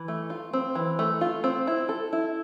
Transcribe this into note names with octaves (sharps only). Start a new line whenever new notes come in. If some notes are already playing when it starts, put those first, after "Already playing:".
Already playing: E3
A3
F4
C4
E3
A3
F4
C4
E4
A4
E4